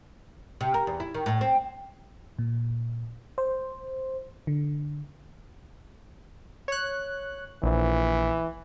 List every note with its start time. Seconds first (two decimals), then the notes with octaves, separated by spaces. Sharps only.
0.61 C3
0.74 A#4
0.87 E2
1.00 E4
1.14 D#3
1.26 A2
1.41 C4
2.39 A#2
3.38 C5
4.47 D3
6.68 C#5 F#6
7.63 A#1 E3